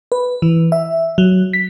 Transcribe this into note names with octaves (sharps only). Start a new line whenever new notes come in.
B4
E3
E5
F#3
B6